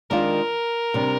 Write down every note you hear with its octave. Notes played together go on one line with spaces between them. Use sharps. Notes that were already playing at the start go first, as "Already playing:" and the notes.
D#3 G#3 D4 F4 A#4
C3 G3 D4